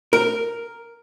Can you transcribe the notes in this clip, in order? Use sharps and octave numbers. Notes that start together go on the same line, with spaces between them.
A#4